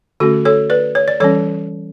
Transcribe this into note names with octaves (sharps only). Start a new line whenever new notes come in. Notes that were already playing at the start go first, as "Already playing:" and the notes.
D3 A3 C#4 F#4 A4
A4 C#5
B4 D5
C#5
D5
E3 G3 C#4 A4 C#5